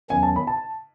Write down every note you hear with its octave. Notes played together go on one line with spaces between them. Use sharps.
E2 D#3 F#3 C#4 G#5
A5
B5
A5